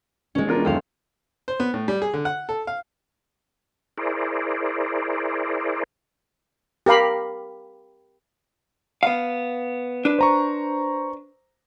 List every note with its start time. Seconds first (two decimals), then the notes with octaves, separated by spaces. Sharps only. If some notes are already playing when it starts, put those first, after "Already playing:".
0.35 D#1 G#3 C#4
0.47 E1 D4 F4 A#4
0.65 F#2 D#3 A4 C5 F5
1.48 C5
1.60 B3
1.74 A2
1.88 G3
2.02 G#4
2.14 D3
2.25 F#5
2.49 A4
2.67 F5
3.98 E4 G#4 A#4 C5 D5
6.86 G4 A#4 F5 B5
9.03 B3 F5
10.05 D4 B4
10.19 C5 A#5 C#6